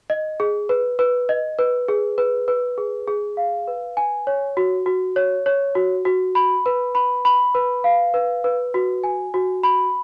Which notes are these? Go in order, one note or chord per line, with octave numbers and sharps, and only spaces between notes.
D#5
G#4
B4
B4
D#5
B4
G#4
B4
B4
G#4
G#4
F5
B4
G#5
C#5
F#4
F#4
C#5
C#5
F#4
F#4
B5
B4
B5
B5
B4
F5
B4
B4
F#4
G#5
F#4
B5